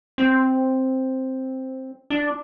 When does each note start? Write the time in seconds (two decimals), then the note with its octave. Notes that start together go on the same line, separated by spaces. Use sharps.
0.18 C4
2.10 D4